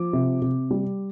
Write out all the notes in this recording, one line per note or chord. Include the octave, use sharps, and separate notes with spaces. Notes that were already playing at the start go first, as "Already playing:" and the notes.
Already playing: F3 D6
C3
C3
G3